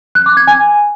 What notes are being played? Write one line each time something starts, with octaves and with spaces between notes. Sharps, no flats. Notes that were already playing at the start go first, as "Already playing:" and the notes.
F#6
D6
G#6
G#5